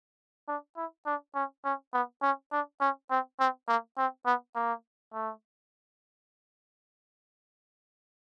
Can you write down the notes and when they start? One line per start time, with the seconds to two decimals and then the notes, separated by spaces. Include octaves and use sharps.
0.48 D4
0.77 E4
1.06 D4
1.35 C#4
1.65 C#4
1.93 B3
2.22 C#4
2.52 D4
2.81 C#4
3.10 C4
3.40 C4
3.68 A#3
3.98 C4
4.26 B3
4.55 A#3
5.14 A3